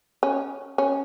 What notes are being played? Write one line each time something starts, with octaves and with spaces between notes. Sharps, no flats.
C#4
C#4